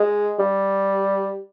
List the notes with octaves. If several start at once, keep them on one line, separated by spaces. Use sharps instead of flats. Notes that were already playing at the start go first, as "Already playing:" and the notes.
Already playing: G#3
G3